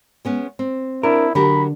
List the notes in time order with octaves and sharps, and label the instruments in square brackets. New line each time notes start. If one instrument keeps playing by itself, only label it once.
[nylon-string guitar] G#3 B3 C#4
C4
[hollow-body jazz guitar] D4 A#4 [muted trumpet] E4
[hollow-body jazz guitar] D3 [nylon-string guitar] F#3 G4 A#4 [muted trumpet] B5